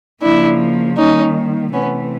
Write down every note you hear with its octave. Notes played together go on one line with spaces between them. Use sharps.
C#3 F3 A#3 D4 E4
D#3 G3 A#3 C#4 D#4
C3 E3 A3 B3 C#4